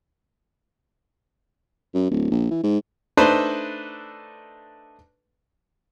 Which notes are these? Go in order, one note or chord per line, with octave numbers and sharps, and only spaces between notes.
F#2
D1
A#1
E3
G#2
A3 D4 D#4 A4 B4 C5